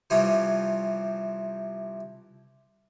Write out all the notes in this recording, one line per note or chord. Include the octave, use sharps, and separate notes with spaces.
C3 E3 F3 G3 C#4